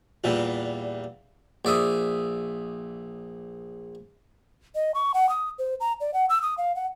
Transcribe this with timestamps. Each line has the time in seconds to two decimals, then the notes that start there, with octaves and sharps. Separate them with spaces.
0.24 E2 A#2 E3 G3
1.65 A#1 D5 E5 D#6
4.75 D#5
4.95 C#6
5.14 F#5
5.29 D#6
5.59 C5
5.80 A#5
6.01 D5
6.14 F#5
6.29 E6
6.42 D#6
6.58 F5
6.76 F#5